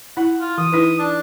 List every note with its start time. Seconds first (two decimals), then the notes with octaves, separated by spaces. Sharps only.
0.17 E4 F#5
0.40 F4
0.58 E3 D#6
0.72 D#4 E4 B4
0.99 D4